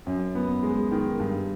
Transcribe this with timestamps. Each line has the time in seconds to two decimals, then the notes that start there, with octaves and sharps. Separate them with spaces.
0.07 F#2
0.35 B3
0.63 G#3
0.91 D#3
1.20 G2